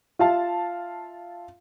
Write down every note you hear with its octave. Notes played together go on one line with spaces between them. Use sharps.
F4 E5 F5 A5